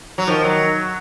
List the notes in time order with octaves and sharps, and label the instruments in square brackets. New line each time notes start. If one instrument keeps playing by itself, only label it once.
[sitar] F#3
[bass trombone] D#3 [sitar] F3
[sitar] F#3